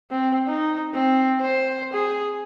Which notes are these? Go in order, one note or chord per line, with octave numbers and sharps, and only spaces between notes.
C4
D#4
C4
C5
G#4